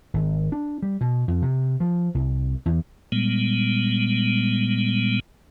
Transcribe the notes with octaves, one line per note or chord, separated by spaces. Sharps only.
G#1
D4
G3
B2
F2
C3
F3
C2
E2
A#2 G3 G#3 B3